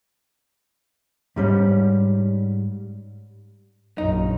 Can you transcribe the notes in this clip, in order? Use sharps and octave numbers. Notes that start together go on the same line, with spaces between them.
G#2 G3 C#4
A#1 F#2 D#4